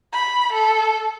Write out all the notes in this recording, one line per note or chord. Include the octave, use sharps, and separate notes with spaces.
B5
A4